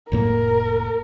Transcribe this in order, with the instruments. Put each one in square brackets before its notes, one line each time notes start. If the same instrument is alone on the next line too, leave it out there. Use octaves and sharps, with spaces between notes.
[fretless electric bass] F1 A2 A#3 [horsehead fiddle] A#4